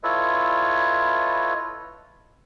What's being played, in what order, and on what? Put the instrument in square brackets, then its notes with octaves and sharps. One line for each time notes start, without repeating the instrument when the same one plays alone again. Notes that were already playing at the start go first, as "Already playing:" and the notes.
[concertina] E4 F4 A4 B4 C#5 D#5